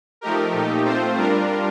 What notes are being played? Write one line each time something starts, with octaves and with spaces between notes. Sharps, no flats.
F3 A3 D#4 G4 A#4
A#2 A3 D#4 G4
A3 C4 F4 C5
G3 D4 F4 A#4